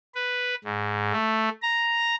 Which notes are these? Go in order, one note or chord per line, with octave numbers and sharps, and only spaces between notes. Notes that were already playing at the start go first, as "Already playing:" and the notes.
B4
G#2
A3
A#5